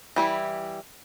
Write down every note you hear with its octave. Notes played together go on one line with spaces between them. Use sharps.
E3 G3 E4